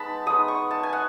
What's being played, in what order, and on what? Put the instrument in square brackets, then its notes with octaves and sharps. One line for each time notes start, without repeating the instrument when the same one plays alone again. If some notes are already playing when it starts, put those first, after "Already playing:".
Already playing: [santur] G#3 B3 D#4 A5 B5
G#3 B3 D#4 D#6
C#6
A5
G#5
F#5